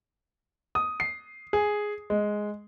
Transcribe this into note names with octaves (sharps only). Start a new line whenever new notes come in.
D#6
C7
G#4
G#3